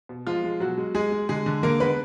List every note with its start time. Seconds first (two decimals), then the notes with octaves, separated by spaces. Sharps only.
0.09 B2
0.27 F3 G#3 F4
0.44 G#3
0.60 B2 F#3 F#4
0.78 G#3
0.95 G#3 G#4
1.12 G#3
1.29 D3 G#3 G#4
1.46 D3
1.63 D3 A#3 A#4
1.80 G#3 B3 B4